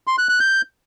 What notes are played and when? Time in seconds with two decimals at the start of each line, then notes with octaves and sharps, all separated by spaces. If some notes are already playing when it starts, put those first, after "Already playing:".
0.07 C6
0.18 F#6
0.29 F#6
0.40 G6